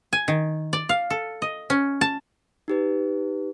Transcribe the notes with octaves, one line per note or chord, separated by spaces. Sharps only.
G#5
D#3
D5
F5
A4
D#5
C#4
A5
D#4 G4 B4